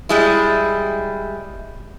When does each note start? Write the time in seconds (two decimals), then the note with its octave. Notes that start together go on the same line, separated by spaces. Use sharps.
0.09 G3 G#3 E4